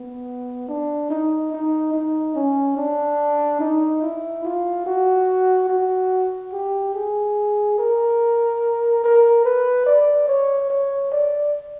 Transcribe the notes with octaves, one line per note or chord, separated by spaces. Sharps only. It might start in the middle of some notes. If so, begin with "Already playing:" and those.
Already playing: B3
D4
D#4
D#4
D#4
C#4
D4
D#4
E4
F4
F#4
F#4
G4
G#4
A#4
A#4
B4
D5
C#5
C#5
D5